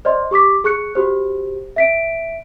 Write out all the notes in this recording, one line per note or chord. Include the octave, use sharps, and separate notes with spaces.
C5 D5 D#5 C6
G4 C#6 D6 B6
G#4 C#6 F#6 C#7
F#4 G4 C5
E5 B6 D7